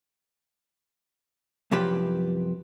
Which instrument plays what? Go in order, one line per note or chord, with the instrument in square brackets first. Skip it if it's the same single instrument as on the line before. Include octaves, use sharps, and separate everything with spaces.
[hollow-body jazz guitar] C2 F#2 F3 G4 B4